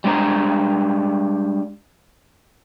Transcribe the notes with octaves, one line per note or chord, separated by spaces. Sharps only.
G3 G#3 D4 C5 A#5